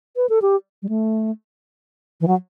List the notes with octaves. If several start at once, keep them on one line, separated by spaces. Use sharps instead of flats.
B4
A4
G4
G3
A3
E3
F#3